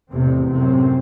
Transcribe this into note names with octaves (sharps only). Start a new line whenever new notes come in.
A1 E2 C3 C4
F#2 A2 C3 C4